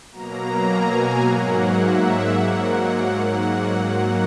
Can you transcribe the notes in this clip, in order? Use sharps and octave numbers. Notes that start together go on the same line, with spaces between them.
B2 F#3 A#3 A#5
G#5
G#2 F#3 A#3 F#5
E5
G#2 F#3 A#3 F#5